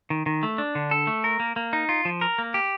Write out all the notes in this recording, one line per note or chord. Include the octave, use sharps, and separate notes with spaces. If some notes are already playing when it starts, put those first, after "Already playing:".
D#3
D#3
A3
D4
D3
A4
A3
A#4
A#3
A#3
D#4
F4
F3
A#4
A#3
G4